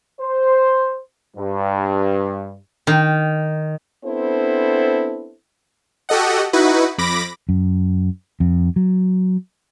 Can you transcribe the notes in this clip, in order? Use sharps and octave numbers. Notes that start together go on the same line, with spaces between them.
C5
G2
D#3
B3 C4 D4 E4 A4 C5
F#4 G4 A4 D#5 F#5
D#4 E4 F#4 B4
F2 B5 D6 A#6
F#2
F2
F#3